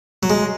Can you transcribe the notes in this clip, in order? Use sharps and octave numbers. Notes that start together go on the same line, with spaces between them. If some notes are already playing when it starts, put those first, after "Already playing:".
F#3
G#3